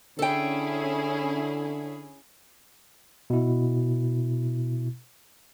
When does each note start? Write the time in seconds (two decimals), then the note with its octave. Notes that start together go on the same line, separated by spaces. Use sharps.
0.19 D3 C#4 E4 G#4 A4 G5
3.30 B2 E4